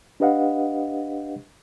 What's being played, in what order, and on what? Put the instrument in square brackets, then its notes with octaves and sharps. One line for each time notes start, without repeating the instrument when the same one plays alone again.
[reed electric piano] D4 G4 B4 D#5 F5 F#5